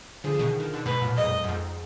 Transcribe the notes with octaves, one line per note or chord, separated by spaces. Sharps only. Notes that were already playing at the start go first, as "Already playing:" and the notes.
D3 F3 G#4
F3
B2 D#3
D#3
D3
G#2 B2 B4
F#2 A#2
F2 G#2 D#5
F#2
F2 G#2